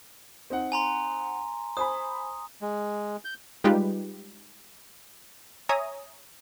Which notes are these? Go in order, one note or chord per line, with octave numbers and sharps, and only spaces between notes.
C4 D#4 F#5
G#5 A#5 C6
C5 G#5 B5 D#6
G#3
G6
G3 G#3 D#4 F4 G4 B4
C#5 E5 G#5 A#5 D#6